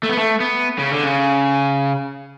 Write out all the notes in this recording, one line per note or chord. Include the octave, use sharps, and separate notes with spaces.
A3
B3
A3
B3
C#3
D3
C#3